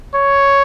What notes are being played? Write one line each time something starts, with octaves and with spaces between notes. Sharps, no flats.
C#5